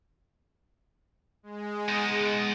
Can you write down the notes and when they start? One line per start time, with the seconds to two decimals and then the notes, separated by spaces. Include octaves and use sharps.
1.43 G#3
1.88 B3 D#4